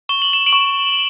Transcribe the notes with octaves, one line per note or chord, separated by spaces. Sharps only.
C#6 G7
F#7
E7
D7 F#7
C#6